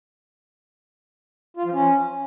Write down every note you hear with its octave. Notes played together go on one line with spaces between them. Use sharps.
F4
F3
C#4